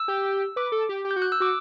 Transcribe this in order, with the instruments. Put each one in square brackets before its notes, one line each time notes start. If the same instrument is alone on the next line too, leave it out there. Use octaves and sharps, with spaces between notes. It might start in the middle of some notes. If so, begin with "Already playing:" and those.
Already playing: [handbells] E6
[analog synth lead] G4
[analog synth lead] B4 [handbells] D6
[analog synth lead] A4
G4
G4
[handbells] G6
[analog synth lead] F#4
[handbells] F#6
E6
[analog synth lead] F#4 [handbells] D6